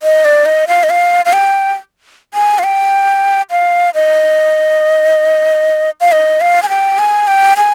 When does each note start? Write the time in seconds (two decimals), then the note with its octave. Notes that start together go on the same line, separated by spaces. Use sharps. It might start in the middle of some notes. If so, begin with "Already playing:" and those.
0.03 D#5
0.25 D5
0.46 D#5
0.68 F5
0.83 D#5
0.90 F5
1.25 F5
1.33 G5
2.34 G#5
2.59 F5
2.64 G5
3.51 F5
3.95 D#5
6.01 F5
6.12 D#5
6.41 F5
6.63 G#5
6.69 G5
6.99 G#5
7.27 G5
7.57 G#5